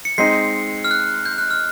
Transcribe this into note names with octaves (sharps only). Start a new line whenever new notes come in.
C#7
G#3 C4 D#4 C7
F6
F#6
G6
F#6
F6